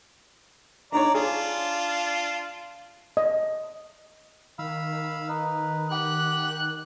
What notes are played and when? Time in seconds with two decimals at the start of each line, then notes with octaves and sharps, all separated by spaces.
0.92 D4 D#4 C#5 D5 A#5
1.14 D4 F4 G#4
3.17 D#5
4.59 D#3 F5 B5 E6
5.29 D#4 B4
5.91 G4 F#5 G5 F#6